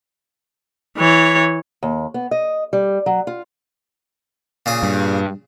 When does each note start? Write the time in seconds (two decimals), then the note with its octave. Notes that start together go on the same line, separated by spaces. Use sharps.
0.98 E3 C#5
1.83 D#2
2.14 B3
2.31 D#5
2.73 G3
3.06 F#3
3.27 F4
4.66 A#2 C#3 G#4
4.83 G2